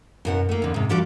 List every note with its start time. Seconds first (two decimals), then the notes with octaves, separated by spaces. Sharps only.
0.25 F#2 B2 F#5
0.49 A3 A#3
0.62 F2 D3
0.74 G#2 C3
0.89 D3 F3 G3 F#4 D5